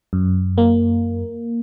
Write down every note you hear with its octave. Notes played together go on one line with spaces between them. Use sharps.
F#2
A#3